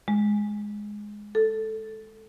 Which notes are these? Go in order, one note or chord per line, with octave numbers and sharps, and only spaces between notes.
G#3
A4